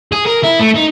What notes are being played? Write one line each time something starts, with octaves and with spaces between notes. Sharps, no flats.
G#4
A#4
E4
A3
D#4